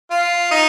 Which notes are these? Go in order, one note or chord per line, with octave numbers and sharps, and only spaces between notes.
F4
D#4